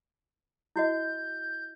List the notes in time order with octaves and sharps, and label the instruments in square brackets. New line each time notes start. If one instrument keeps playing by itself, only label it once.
[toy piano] E4 F#4 D#5 [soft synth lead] G6